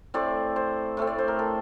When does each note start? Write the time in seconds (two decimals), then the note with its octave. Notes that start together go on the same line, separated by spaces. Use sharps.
0.14 A2 A3 C4 D5
0.56 C5
0.97 A2 A3 C4
1.07 D5
1.19 C5
1.28 A#4
1.39 A4